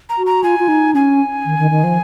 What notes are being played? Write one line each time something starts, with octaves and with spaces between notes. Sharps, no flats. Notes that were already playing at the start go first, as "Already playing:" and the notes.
A#5
F#4
A#5
F4 G#5
F4
D#4
C#4 G#5
D#3
D#3
D#3
F3